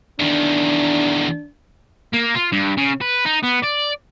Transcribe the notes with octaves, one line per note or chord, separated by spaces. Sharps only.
E2 D#3 D4
A#3
F4
G2
C#3
B4
D#4
B3
D5